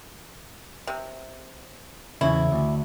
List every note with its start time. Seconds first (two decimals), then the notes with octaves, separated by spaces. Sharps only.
0.87 C3
2.21 E2 C#3 E4
2.52 D2